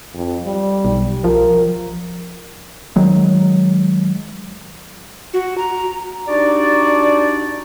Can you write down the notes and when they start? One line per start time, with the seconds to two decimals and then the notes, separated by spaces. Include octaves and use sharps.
0.14 F2
0.44 G3
0.85 B1
1.24 F3 A#4
2.96 D#3 F#3 G#3
5.34 F#4
5.58 A#5
6.27 D4 D#4 F#4 G4 D5